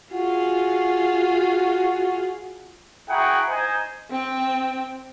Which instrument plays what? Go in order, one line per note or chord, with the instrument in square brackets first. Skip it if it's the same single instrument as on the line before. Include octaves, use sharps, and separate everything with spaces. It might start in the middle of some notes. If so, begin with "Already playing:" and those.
[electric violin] F4 G#4 [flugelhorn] F#4
[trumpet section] E4 F#4 G#4 F#5 G5 A#5
D#4 C5 G#5
[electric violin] C4 G5